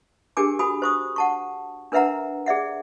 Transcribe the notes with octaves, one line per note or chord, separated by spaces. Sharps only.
D4 G4 G#4 A#4 G#5 D6
F#4 G#5 B5 D#6
C5 C#6 D#6
F#5 A5 C#6
D4 A#4 B4 E5 F#5 A#5
G#4 D5 E5 F#5